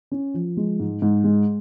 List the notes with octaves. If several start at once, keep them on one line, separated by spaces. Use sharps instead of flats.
C#4
F3
G#3
G#2
G#2
G#3